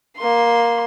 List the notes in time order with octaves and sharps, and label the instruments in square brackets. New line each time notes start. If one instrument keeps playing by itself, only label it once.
[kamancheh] A#3 C6